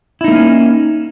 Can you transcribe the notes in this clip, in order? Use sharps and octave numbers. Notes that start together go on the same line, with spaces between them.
A3 A#3 C#4 D#4 E4